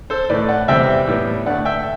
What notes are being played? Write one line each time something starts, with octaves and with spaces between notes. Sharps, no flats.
A4 C5
A2 E3 A3 B4 D5
D5 F#5
E2 C3 G3 C4 E5 G5
A2 G3 B3
G2 D3 A3 D5 F#5
E5 G5